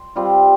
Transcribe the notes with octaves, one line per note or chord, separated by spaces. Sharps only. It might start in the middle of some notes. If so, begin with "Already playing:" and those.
Already playing: C6
G3 C4 F4